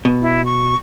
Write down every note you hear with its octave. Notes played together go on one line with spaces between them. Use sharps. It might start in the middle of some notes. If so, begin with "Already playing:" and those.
B2
E4
C#6